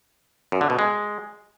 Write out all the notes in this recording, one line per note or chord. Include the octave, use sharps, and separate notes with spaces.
F#2
D3
B2
G#3